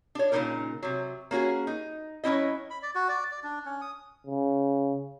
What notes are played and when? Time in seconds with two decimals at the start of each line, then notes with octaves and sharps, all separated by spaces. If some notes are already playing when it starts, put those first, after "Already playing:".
0.15 D4 C#5
0.32 A#2 C#3 G3 C#4 D#4 A#4
0.83 C3 F#3
1.31 A#3 C#4 F#4 G#4
1.67 D#4
2.24 F#3 C#4 E4 D#5
2.70 B5
2.83 D5
2.95 F#4
3.09 D5
3.32 D5
3.44 D4
3.66 C#4
3.81 D#6
4.27 C#3